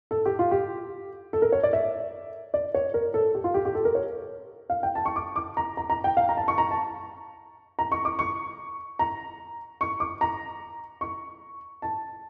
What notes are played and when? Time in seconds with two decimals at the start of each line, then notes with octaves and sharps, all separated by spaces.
0.11 A4
0.25 G4
0.39 F4
0.51 G4
1.33 A4
1.42 A#4
1.52 C#5
1.63 D5
1.73 E5
2.54 D5
2.74 C#5
2.94 A#4
3.14 A4
3.34 G4
3.44 F4
3.54 G4
3.65 G4
3.75 A4
3.85 A#4
3.95 C#5
4.70 F5
4.83 G5
4.95 A5
5.05 C#6
5.16 D6
5.36 D6
5.57 A#5
5.77 A#5
5.90 A#5
6.04 G5
6.17 F5
6.29 A#5
6.37 A5
6.48 C#6
6.58 A#5
6.71 A5
7.79 A#5
7.92 C#6
8.05 D6
8.19 C#6
8.99 A#5
9.81 C#6
10.00 D6
10.21 A#5
11.01 C#6
11.82 A5